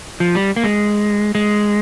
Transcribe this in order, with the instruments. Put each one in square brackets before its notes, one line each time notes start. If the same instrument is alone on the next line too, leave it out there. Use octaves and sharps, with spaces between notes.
[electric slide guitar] F3
G3
A#3
G#3
G#3